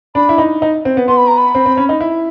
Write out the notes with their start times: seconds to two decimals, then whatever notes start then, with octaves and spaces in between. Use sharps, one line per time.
0.15 D4 B5
0.29 E4
0.38 D#4
0.62 D#4
0.85 C4
0.97 B3
1.08 B3 C6
1.17 B5
1.27 A#5
1.38 B5
1.55 C4
1.66 C4
1.77 C#4
1.89 D#4
2.01 E4